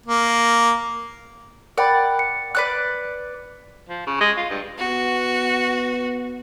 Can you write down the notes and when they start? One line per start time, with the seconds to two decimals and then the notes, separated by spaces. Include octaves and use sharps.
0.06 A#3
1.78 A#4 D5 F#5 G5 B5
2.19 C#7
2.55 B4 D5 F#6
3.89 F3
4.07 C#3
4.21 G#3
4.37 F4
4.50 G2
4.79 B3 F#4